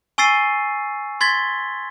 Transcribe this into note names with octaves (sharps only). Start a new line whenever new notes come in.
G#5 C#6 E6 A6 C7 D#7
C6 G#6 A6 B6 G7